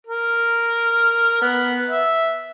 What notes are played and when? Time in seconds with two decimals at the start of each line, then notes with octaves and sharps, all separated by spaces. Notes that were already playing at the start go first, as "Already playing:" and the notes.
0.07 A#4
1.42 B3
1.90 E5